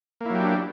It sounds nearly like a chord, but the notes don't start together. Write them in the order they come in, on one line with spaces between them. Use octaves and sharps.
A#3 E4 F#3 G4 D4